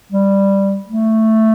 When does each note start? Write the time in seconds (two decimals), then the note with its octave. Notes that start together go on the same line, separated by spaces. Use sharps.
0.12 G3
0.89 A3